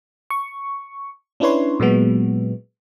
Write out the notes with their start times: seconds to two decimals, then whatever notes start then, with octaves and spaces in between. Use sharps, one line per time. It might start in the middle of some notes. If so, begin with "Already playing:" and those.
0.30 C#6
1.40 C#4 D4 E4 B4 C#5 C6
1.80 A#2 F#3 G#3 B3